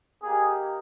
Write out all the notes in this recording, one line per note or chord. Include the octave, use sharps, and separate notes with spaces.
A#3 D#4 G4 G#4